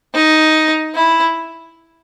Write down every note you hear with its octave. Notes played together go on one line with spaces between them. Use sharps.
D#4
E4